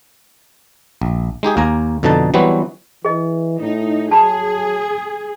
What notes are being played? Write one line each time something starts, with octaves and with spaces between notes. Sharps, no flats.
A#1
G#3 D#4 G4 G#4
D#2 A#3 G#5 A#5
F2 B2 D3 D#4 A5
E3 F#3 G3 B3 C4 F#4
E3 G#4 D#5
A2 D#4
F#3 G#4 A5 B5